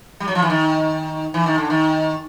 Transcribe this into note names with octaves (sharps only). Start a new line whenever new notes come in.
G3
F#3
F3
E3
D#3
E3
D#3
D3
D#3